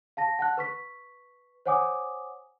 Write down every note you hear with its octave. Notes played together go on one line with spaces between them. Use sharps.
F5 A5 A#6
F#5 A5 F#6
B4 C#6 B6
C5 C#5 F#5 G#5 D6 D#6